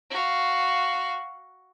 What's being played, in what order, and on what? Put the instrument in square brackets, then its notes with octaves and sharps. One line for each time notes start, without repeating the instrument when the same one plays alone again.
[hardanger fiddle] F#4 F5